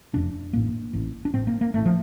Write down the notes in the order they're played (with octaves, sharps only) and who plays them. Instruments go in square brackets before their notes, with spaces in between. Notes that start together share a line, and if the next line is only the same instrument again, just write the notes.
[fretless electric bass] F1 F2 C3 D4
A1 A2 A#3
A1 A2
D4
A1 A2 C4
A#3
A#3
A1 A2 A3
F3